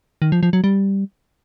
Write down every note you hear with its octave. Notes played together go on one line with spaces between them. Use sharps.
D#3
F3
F3
F#3
G3